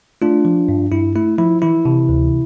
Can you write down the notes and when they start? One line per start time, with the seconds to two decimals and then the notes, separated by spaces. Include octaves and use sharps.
0.22 A3 D4 F4
0.45 F3
0.69 G2
0.92 G2 E4
1.15 A3 E4
1.38 F3 E4
1.62 E3 E4
1.85 C3
2.09 D2